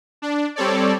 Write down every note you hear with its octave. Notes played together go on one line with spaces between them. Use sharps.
D4
G3 C4 A4 C#5 D5